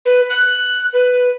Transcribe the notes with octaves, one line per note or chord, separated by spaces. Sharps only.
B4
F#6
B4